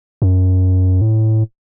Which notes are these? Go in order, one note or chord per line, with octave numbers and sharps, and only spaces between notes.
F#2
A2